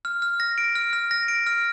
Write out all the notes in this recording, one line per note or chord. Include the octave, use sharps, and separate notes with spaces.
F6
F6
A#6
D7
F6
F6
A#6
D7
F6